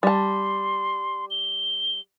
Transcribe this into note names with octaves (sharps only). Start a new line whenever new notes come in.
G3 A5 C6
G7